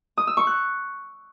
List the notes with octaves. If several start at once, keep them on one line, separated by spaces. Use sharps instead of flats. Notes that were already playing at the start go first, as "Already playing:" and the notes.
D#6
E6
C#6
F#6